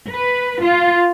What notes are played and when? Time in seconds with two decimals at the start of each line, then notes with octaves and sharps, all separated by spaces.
0.10 B4
0.62 F4